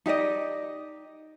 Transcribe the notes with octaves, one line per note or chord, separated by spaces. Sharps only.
D#4 G4 D5 D#5